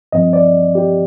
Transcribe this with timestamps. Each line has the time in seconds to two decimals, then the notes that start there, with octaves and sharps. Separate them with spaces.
0.12 G2 F3 C4 D#5
0.33 D5
0.75 G4